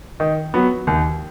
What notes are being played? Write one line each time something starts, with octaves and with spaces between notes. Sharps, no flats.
D#3
F#3 B3
D#2